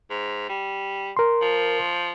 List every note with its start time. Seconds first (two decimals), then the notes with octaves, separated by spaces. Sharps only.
0.10 G#2
0.49 G3
1.17 A#4 C6
1.42 F3